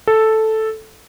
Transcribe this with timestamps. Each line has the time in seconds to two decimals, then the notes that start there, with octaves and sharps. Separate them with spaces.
0.07 A4